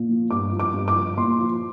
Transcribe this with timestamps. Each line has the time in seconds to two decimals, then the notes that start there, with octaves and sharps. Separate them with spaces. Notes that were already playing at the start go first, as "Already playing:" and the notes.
Already playing: A#2
0.09 F3
0.30 G2 D6
0.52 F3
0.59 D6
0.73 G2
0.88 D6
0.95 F3
1.17 A#2 C6
1.39 F3